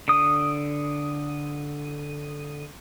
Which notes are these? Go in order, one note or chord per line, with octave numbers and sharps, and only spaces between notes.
D3 D#6